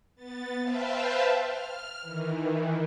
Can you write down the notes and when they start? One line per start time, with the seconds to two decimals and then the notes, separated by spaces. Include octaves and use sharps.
0.15 B3 A6
0.60 B4 C5 E5 F5 G5 A5
1.41 F6
2.02 D#3 E3